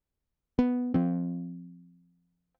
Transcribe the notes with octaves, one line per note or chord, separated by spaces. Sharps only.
B3
F3 C4